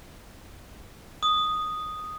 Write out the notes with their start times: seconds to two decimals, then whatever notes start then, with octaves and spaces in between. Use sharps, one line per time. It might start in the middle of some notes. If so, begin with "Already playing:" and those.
1.23 D#6